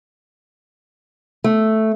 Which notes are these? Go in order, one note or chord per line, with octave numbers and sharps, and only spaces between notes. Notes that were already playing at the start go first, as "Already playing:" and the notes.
A3